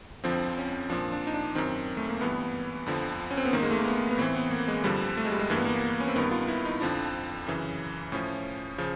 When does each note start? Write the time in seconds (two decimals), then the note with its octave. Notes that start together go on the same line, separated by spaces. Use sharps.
0.24 F2 D3 F3 C4
0.58 C#4
0.90 A#2 F3 D4
1.12 D4
1.27 D#4
1.34 D4
1.55 F#2 D#3 C4
1.97 A3
2.09 A#3
2.21 G2 E3 B3
2.86 F2 D3 F3
3.31 C#4
3.37 C4
3.45 B3
3.53 G#2 D#3 A#3
3.63 G#3
3.70 A3
3.78 A#3
3.85 B3
4.11 B3
4.18 A2 E3 C4
4.35 B3
4.51 A#3
4.68 G#3
4.84 G2 D3 F3 G3
5.17 A3
5.25 G#3
5.32 G3
5.39 G#3
5.50 G2 E3 A#3
5.57 B3
5.65 A#3
6.00 C#4
6.08 C4
6.16 G2 D#3 B3
6.31 F4
6.48 E4
6.65 D#4
6.81 F2 D3 F3 D4
7.47 F#2 C#3 E3
8.12 A2 F3 C#4
8.78 C#3 F3